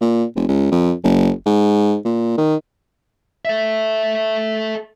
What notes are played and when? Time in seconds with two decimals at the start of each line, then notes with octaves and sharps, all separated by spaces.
0.01 A#2
0.36 F1
0.48 C#2
0.71 F2
1.04 F#1
1.46 G#2
2.05 A#2
2.38 D#3
3.45 A4 E5